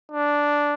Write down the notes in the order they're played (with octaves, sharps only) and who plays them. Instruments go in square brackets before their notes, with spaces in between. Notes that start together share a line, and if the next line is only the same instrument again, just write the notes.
[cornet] D4